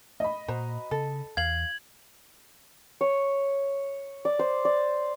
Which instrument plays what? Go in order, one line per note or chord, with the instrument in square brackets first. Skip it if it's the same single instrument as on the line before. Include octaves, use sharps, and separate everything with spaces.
[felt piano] D#5 B5
[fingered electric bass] A#2 [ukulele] F#4 C5 A#5
[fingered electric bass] C#3 [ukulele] A4
[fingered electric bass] E2 [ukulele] F5 [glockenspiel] G#6 F#7
[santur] C#5
D5
C5
D5